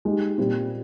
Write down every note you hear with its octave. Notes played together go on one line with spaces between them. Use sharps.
G#3 D#4 G4
A#2 G3 C4